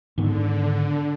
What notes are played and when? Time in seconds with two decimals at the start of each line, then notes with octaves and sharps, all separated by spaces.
0.18 G#2 D3 D#3 B3